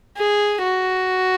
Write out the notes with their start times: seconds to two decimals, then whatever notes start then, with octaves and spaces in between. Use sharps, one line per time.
0.17 G#4
0.63 F#4